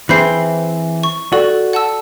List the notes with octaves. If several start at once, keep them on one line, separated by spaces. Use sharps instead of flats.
E3 C4 G#4 B5 G6 C7
C#6
F#4 A4 D5
F#5 A5 E6